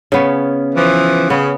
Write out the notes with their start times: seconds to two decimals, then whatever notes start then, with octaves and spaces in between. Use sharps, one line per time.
0.12 C#3 B3 C#4
0.75 E3 F3
1.30 C#3 B3